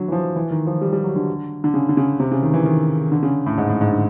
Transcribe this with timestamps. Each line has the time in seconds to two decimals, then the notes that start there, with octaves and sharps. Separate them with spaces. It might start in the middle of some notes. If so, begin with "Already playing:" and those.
Already playing: D3 F#3
0.08 E3
0.12 F3
0.36 E3
0.51 D#3
0.67 F3
0.81 G3
0.93 G3
1.04 F#3
1.16 D3
1.64 D3
1.74 C#3
1.89 D3
1.97 C#3
2.20 C3
2.31 C#3
2.43 D#3
2.54 E3
2.65 D#3
3.12 D3
3.23 C#3
3.46 A2
3.58 G#2
3.69 A2
3.81 G#2
3.92 D3